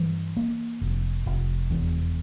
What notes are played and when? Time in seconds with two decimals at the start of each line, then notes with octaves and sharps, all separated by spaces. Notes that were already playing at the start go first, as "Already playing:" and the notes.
Already playing: G2 E3
0.37 A#3
0.81 F1
1.26 F1
1.70 E2